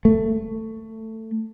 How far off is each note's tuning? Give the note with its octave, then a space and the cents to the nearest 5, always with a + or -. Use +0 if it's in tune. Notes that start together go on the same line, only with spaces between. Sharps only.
A3 +15